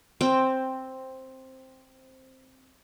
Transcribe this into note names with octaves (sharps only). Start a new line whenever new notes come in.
C4 G5